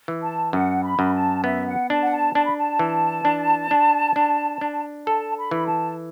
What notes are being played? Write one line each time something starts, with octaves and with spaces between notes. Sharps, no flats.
E3
A5
F#2 F#5
B5
F#2
A5
B3 E5
F#5
D4 A5
F#5
A5
D4 A5
B5
A5
E3
D4
D4
D4
D4
A4 A5
B5
E3
A5